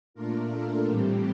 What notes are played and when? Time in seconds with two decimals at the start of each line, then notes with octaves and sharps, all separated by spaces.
0.14 A#2 A3 D4 F4 A#4
0.50 A4
0.86 A2 E3 G3 C4 G4